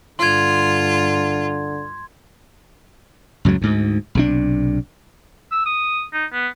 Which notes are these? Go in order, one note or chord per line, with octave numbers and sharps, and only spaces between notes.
G2 D3 F4 C6 G#6
C#2 F#2 A2 F#3
D2 G#2
B1 C3 D4
E6
D#6
D#4
B3